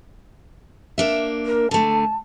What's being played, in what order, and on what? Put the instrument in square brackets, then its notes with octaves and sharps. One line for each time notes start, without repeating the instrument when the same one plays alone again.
[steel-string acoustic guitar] A#3 D4 E5
[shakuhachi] A#4
[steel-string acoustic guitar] D3 A3 [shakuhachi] A5